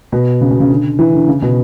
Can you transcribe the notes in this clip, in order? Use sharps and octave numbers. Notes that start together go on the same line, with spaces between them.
B2
C#3
B2
C#3
D3
E3
D3
C#3
B2